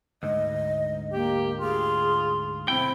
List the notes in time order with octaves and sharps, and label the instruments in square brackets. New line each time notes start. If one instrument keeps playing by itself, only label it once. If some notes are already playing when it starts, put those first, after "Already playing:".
[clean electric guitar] D2 G#2 [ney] D#5
[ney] A#3 [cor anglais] G4
[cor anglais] F4 [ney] G#4
[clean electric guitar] B1 G5 [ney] C4 [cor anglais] E4